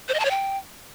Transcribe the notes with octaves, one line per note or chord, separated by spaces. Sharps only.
C5
D#5
A5
C#5
G5